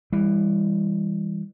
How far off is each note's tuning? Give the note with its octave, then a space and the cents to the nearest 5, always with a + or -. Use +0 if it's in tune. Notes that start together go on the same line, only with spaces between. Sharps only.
E3 +0 G3 +35